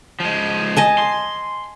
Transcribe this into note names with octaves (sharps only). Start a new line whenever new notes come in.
F3 G#3
D#5 G#5 A5
C6